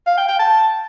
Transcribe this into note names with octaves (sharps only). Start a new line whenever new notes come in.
F5
G5
G5
A5